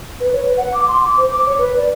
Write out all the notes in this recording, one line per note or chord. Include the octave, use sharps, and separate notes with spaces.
B4
C#5
B4
F#5
D6
C6
D6
C5
D6
C#5
B4
D5